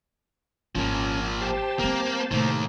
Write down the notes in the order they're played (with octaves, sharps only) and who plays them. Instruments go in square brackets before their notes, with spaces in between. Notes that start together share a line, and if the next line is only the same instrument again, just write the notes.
[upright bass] G#1 [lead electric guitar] F3 A#3 [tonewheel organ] C#4
[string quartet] G4 [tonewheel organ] C5 A5
[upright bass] G3 C4 [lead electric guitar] A#3
[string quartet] A2 [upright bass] C3 [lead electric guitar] D#3 A#3